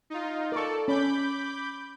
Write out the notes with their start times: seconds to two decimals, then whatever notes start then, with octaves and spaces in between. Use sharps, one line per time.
0.10 D#4 F4
0.52 A4 A#4 D5 C#6
0.88 C#4 B5 D6 G6